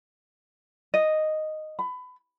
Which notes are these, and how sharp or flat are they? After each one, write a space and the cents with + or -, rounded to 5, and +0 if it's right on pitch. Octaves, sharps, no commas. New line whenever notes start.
D#5 -5
B5 +25